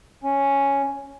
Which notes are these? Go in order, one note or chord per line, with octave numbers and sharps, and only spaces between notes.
C#4